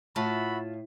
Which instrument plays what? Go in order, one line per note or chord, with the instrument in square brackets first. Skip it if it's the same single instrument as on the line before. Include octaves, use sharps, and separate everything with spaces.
[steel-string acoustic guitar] A2 [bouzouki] F4 A5 [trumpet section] F#4 E5 B5